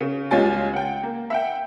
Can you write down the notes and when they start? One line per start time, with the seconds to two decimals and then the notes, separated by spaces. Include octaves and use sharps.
0.01 C#3
0.31 C#2 G3 C#4 F4 G#5 A6
0.73 F#5 G5
1.03 A#3
1.30 E5 F#5 G5